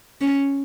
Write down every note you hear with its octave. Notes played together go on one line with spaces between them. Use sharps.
C#4